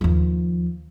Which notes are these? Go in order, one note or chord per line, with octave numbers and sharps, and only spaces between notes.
D#2 F3